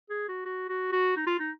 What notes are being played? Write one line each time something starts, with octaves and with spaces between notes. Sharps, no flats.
G#4
F#4
F#4
F#4
F#4
D#4
F4
D#4